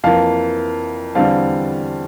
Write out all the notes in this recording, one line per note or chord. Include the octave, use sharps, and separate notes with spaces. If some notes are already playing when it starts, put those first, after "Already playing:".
F2 E3 A#3 F5 A5
E2 D3 G3 C4 F5 A5